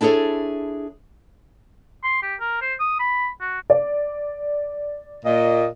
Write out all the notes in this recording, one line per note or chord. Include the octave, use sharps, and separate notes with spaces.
D4 E4 G#4 A4 C#5
C6
G4
A#4
C5
D#6
B5
F#4
D5
A#2 D#5